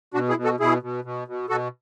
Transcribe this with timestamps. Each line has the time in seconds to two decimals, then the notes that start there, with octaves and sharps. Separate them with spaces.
0.14 B2 D4 F#4
0.29 E4 G#4
0.37 B2
0.44 F#4 A4
0.60 B2 E4 G#4
0.82 B2
1.04 B2
1.28 B2
1.49 B2 F#4 A4